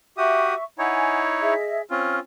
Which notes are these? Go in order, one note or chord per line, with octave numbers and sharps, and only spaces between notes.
F#4 G4 E5 C#6 D#6
D#4 E4 C#5 F#5 G#5
G#4 D#5 E5
C4 C#4 F4 F6